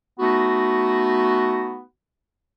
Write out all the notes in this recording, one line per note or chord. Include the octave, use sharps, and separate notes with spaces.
A3 B3 D#4 F#4